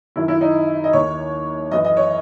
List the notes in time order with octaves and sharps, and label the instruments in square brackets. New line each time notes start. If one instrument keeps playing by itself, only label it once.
[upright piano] F#2 D#3 E4
E4
D#4
D#5
D#2 D#3 C#5
F#2 E3 D#5
D#5
C#5